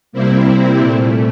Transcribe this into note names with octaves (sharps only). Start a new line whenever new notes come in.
C3 G3 A#3 C4 E4
A#2 A3